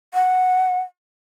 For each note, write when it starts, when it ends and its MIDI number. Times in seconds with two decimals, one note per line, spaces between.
0.14 0.80 78